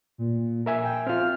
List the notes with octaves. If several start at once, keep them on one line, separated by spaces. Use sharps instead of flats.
A#2
A#4 E5 G#5
G5
C4 F4 F6